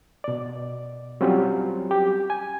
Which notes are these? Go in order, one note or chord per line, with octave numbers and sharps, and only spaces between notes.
B2 D5
F#3 G3 C4 C#4 F4 G4
G4
G#5